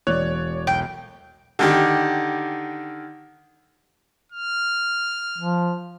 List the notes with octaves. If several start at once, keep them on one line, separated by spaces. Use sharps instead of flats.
E1 C#5 D5 F#6 F7
B1 G5
D3 D#3 G4
F6
F3